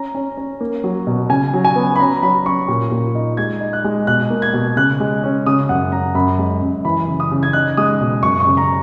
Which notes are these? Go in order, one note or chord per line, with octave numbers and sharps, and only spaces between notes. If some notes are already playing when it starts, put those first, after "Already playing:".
Already playing: C#4 A#5
C#4
C#4
A#3
F#3
B2
C#3 G#5
F#3
G#5
B3
B5
C#4 A#5
F#3 B5
C#4 C#6
A#2
A#2
D#4
G#3 G#6
D#4
F#6
G#3
B2 F#6
A#3
G#6
B2
C#3 F#6
G#3
C#4
C#3 D#6
F#2 F#5
F#2 A#5
F#2 B5
G#3
F#2
E3 B5
C#3
D#6
C#3
G#6
D#4 F#6
G#3 D#6
B2
F#2 C#6
C#6
C#3
A#5